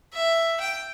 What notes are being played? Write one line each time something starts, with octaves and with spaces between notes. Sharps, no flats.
E5
G5